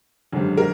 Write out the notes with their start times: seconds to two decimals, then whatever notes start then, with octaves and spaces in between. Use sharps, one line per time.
0.32 G#1 F#2 D3 G3
0.57 A#4